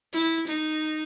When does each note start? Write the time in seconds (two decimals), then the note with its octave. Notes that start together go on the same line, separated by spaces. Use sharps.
0.14 E4
0.47 D#4